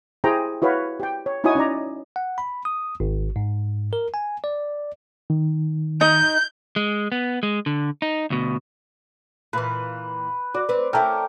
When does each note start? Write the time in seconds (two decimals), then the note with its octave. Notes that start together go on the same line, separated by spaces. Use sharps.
0.24 E4 G4 G#4 C5 G5 A#5
0.62 E4 F#4 B4 C#5 F5 B5
1.00 G4 G5
1.26 C#5
1.44 D#4 E4 F#4 C#5 G#5 D#6
1.55 C#4 D#4 D5 A#5
2.16 F#5
2.38 B5
2.65 D#6
3.00 G#1
3.36 G#2
3.93 A#4
4.14 G#5
4.44 D5
5.30 D#3
6.01 D#4 D#5 G6
6.76 G#3
7.12 B3
7.43 G#3
7.66 D3
8.02 D#4
8.30 D2 B2
9.53 A#2 E3 B4
10.54 F#4 D5
10.69 C4 B4
10.93 C#4 E4 A4 A#4 G5